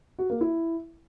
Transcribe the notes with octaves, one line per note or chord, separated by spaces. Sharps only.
F#4
A#3
E4